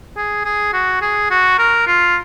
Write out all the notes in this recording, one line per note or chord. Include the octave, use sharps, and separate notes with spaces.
G#4
G#4
F#4
G#4
F#4
A#4
F4